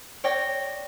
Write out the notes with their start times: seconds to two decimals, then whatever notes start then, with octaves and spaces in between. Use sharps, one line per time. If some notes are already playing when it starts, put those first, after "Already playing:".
0.24 C#5 D5 G5 A#6